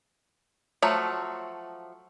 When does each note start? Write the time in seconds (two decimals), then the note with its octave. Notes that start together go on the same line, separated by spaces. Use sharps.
0.82 F3 F#3 A3